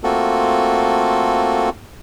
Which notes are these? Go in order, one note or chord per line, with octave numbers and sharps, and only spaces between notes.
A3 A#3 C4 F4 F#4 A4